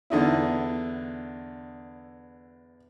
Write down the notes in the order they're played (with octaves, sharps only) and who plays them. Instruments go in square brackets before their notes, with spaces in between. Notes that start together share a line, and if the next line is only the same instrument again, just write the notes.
[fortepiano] E2 D3 D#4 E4